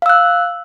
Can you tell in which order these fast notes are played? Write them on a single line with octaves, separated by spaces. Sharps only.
F5 E6 F#6